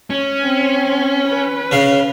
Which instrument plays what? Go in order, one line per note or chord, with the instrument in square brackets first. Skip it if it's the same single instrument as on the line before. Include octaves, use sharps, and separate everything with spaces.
[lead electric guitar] C#4
[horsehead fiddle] C4
B4
[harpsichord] C#3 F5